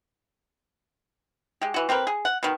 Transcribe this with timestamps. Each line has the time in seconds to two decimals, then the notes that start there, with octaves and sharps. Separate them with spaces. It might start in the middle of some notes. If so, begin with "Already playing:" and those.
1.61 G#3 G4
1.74 E3 F#4
1.89 C4 G4 A#4 B4
2.07 G#4
2.25 F#5
2.43 B2 D#3